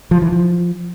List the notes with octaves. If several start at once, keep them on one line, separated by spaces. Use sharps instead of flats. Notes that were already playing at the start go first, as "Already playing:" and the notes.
F3
E3
F3